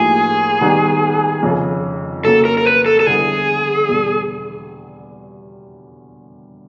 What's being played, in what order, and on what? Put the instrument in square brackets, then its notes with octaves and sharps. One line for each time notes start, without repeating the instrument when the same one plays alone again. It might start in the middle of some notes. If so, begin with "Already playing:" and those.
Already playing: [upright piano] A2 F3 A#3 D#4 G4 [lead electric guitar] G#4
[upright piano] D#3 G3 B3 D#4 G4
F1 F2 C#3
[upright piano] C#3 F#3 A#3 [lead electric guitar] A4
[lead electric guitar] A#4
A#4
B4
A4
A4
[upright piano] D3 G3 B3 E4 [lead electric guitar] G#4
[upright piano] E2 B2 G3